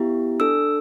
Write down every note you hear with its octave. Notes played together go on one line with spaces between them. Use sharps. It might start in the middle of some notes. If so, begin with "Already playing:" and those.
Already playing: B3 E4 G4
D4 A4 E6